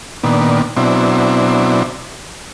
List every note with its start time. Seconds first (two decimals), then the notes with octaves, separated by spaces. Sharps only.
0.23 A#2 D#3 B3 D4
0.77 B2 F#3 C4 D4 E4